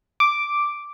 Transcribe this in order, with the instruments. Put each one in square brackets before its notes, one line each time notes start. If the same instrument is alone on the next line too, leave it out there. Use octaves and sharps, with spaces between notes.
[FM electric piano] D6